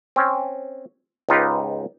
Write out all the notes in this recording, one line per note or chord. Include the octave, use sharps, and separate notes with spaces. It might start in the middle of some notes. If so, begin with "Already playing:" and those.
C4 C#4
C#2 G#2 D#4 F4 G4 B4